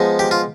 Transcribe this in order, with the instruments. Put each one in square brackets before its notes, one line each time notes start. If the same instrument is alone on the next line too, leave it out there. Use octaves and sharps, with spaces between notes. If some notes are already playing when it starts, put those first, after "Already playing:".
Already playing: [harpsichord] F3 G#3 B3 D#4
G4
F4